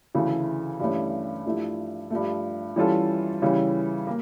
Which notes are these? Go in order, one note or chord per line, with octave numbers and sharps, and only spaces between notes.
D2 C#3 E3 A3
G2 E3 A3 C#4
G2 F3 A3 E4
G2 F3 A3
E3 G3 C#4 F4 A4
C#3 E3 G3 C#4
A#3